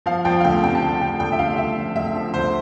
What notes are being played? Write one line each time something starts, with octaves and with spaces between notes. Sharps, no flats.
F3 F5
F3 G5
F5
D2 G5
C3 G5
A5
D2 G5
D2 G5
D2 G5
E5
D2 F5
D2 E5
F3
D2 E5
F3
D2 C5